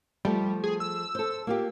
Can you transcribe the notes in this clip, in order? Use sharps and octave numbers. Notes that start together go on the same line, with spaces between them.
F3 G3 A3
G#4
E6
A4 C5
A#3 F4 G4